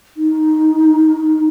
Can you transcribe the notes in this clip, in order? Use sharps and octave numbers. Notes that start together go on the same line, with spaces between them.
D#4